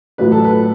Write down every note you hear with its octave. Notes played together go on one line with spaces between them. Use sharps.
A1 A2 F#3 B4
A4
B4